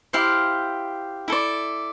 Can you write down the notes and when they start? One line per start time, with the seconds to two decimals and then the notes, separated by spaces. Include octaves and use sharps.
0.13 E4 G4 C5 F5
1.28 E4 A4 D5